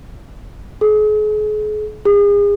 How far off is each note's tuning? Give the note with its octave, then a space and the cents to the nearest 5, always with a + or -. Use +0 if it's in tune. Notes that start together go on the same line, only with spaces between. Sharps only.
G#4 +40
G#4 -35